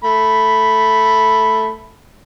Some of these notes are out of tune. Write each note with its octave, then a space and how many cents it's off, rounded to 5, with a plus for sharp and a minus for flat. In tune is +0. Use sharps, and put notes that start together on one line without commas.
A3 +0 B5 +0